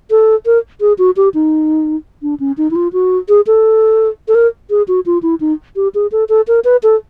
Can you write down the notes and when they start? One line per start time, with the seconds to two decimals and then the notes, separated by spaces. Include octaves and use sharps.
0.10 A4
0.46 A#4
0.81 G#4
0.98 F#4
1.16 G4
1.34 D#4
2.22 D4
2.40 C#4
2.57 D#4
2.71 E4
2.76 F4
2.93 F#4
3.29 G#4
3.47 A4
4.28 A4
4.35 A#4
4.70 G#4
4.88 F#4
5.06 F4
5.23 E4
5.40 D#4
5.76 G4
5.95 G#4
6.12 A4
6.29 A4
6.48 A#4
6.64 B4
6.83 A4